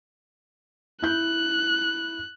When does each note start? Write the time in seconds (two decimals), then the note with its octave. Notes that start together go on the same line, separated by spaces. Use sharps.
1.02 E4 F#6 G6